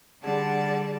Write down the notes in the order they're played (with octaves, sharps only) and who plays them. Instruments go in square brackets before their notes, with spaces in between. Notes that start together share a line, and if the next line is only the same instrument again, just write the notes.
[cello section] D3 G3 [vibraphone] G#4 [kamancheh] D5 A5 [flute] F#5